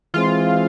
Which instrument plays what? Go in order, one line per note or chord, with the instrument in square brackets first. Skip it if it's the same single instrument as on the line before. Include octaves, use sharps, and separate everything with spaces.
[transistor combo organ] E3 G#3 C4 [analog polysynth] F4